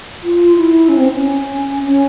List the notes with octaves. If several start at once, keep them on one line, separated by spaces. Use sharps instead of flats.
F4
E4
C#4
C4
C#4
C#4